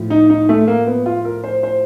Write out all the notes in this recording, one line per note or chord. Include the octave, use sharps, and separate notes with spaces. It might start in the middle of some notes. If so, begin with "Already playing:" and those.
Already playing: A2 F3
D#4
D#4
A3
A#3
B3
F4
A#4
C5
C5